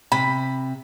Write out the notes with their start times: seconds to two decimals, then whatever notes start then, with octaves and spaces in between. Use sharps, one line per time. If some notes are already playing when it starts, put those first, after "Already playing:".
0.12 C3 B5